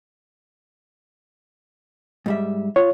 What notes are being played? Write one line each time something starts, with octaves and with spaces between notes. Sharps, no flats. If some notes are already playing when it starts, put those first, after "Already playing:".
G#2 G3 E5
F4 C#5